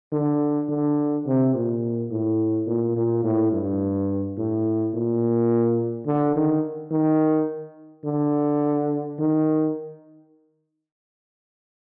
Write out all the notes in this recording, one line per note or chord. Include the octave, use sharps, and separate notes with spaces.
D3
D3
C3
A#2
A2
A#2
A#2
A2
G2
A2
A#2
D3
D#3
D#3
D3
D#3